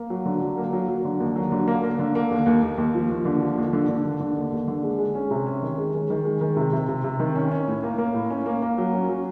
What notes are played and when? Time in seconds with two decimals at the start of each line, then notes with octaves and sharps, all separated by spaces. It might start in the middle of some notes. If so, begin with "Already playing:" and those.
Already playing: A#3
0.10 F#3
0.26 D3
0.42 F#3
0.58 A#3
0.73 F#3
0.88 F#3
1.05 D3
1.20 D#2
1.36 F#3
1.52 D3
1.68 A#3
1.84 A#3
1.99 D3
2.15 A#3
2.31 D#2
2.46 D#2
2.63 D#2
2.78 D#2
2.94 F3
3.10 D#2
3.25 D3
3.41 F3
3.58 D#2
3.73 D3
3.88 D3
4.04 D#2
4.20 D3
4.36 D#2
4.52 D#2
4.68 D3
4.83 G#3
4.99 G#3
5.15 C#4
5.31 C3
5.46 C#4
5.62 D#3
5.78 G#3
5.94 D#3
6.10 D#3
6.25 G#3
6.41 D#3
6.56 C3
6.73 C3
6.89 C3
7.04 C3
7.19 D#3
7.35 C#4
7.52 C#4
7.68 A2
7.83 A#3
7.98 A#3
8.14 A2
8.30 C#4
8.46 A#3
8.62 A#3
8.78 F#3
8.94 C#4
9.09 F#3